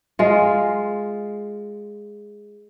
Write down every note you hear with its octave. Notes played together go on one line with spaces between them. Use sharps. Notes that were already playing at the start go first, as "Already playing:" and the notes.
G#3 F4